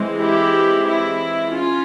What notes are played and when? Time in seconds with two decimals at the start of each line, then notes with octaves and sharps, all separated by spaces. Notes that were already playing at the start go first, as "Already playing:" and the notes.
Already playing: E3 G#3 C4
0.21 E4 G4
0.87 E4
1.54 C#4 F4